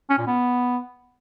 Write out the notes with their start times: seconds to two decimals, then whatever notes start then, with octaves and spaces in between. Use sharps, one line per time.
0.10 C#4
0.18 A#2
0.27 B3